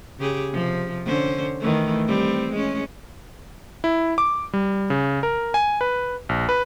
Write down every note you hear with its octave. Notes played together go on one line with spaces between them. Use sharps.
C#3 G4 G#4
C3 F3
D3 C#4 C5
D#3 E3 A3
G3 C4
G#3 C#4
E4
D6
G3
C#3
A#4
G#5
B4
A#1
B4